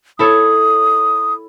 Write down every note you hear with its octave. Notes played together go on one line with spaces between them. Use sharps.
E4 A4 C#5 D#6